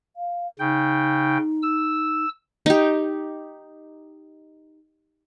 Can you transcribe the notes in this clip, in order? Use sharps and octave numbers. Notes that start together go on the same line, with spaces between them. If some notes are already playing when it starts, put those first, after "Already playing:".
F5
C#3 D#4 G5
E6
D#4 G4